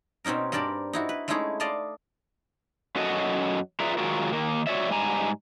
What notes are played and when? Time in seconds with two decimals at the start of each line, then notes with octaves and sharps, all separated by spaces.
0.24 B2 C4 C#4 D#4 A#4
0.52 G2 C4 A#4 D5 A5 B5
0.93 D#4 E4 F#4
1.09 B4
1.28 G#3 A3 C#4 D#4 E4 G#4
1.60 D5 D#5 F5 A5 C6
2.95 F#2 C#4 F#4 A4 D#5
3.80 F4 G#4 B4 D5 E5 A#5
3.98 D#3 F#3 G#3 F4 F#4 A#4
4.32 D#3 A#3
4.67 F#4 C#5 D5 E5
4.90 G#2 G3 G#5 A#5